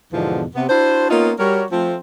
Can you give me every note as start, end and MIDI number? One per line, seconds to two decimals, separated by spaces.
0.13 0.46 40
0.13 0.46 44
0.13 0.46 47
0.13 0.46 50
0.13 0.46 52
0.13 0.46 53
0.55 0.66 48
0.55 0.66 59
0.69 1.10 62
0.69 1.10 64
0.69 1.10 66
0.69 1.10 72
1.10 1.32 58
1.10 1.32 59
1.10 1.32 61
1.10 1.32 63
1.10 1.32 65
1.39 1.65 55
1.39 1.65 66
1.39 1.65 67
1.39 1.65 70
1.39 1.65 73
1.71 1.97 53
1.71 1.97 57
1.71 1.97 60